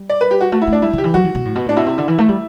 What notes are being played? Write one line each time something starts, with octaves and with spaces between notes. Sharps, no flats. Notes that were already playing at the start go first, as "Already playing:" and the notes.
Already playing: G3
D5
B4
G4
F#4
A3 F#4
E4
A3
D4
G3 E4
D3
G4
E3
F#3 F#4
E3
B2
A2
B2
A2 D4
B2 E4
C3
D3
E3
A3
G3